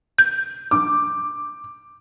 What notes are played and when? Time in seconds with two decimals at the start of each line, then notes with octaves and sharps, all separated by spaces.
0.18 G6
0.71 D6